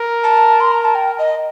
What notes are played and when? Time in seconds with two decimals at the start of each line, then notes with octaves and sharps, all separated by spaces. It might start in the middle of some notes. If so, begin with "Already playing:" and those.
Already playing: A#4
0.24 A5
0.60 C6
0.72 A#5
0.85 A5
0.95 G5
1.19 D#5